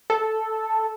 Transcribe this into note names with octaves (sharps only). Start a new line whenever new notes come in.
A4